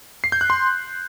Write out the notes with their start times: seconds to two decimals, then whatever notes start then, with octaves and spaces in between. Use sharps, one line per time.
0.24 C7
0.32 G6
0.41 F#6
0.50 C6